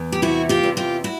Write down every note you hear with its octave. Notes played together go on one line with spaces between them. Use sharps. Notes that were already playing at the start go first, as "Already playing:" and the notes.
Already playing: E2
G4
C3 E4 F#4
F4 G4
E2
F4 G4
E4 F#4